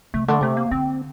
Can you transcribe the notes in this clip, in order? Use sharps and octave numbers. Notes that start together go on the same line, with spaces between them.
C3 A3
D3 A3
C3 A3
A#3
D3 C4